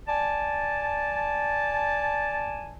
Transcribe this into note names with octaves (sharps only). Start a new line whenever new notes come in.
D5 G#5 A5